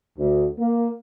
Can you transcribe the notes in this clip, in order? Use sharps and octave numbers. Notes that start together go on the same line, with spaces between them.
D2
A#3